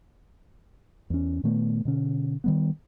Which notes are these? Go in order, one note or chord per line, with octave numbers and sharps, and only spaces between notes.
E2 C#4
A#2 D#3 A3 B3
B2 D3 C#4
D#3 G3 B3